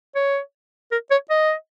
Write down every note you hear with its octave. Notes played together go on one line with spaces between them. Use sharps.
C#5
A#4
C#5
D#5